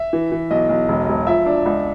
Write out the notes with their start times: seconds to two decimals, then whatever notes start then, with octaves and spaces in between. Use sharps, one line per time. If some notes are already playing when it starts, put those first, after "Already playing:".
Already playing: E5
0.13 E3
0.32 E3
0.51 B1 D#5
0.69 B1
0.88 E1
1.08 E1
1.27 F3 E5
1.46 D4
1.66 C#2